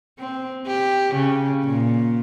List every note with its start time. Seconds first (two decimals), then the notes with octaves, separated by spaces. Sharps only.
0.19 C4
0.67 G4
1.15 C#3
1.64 A#2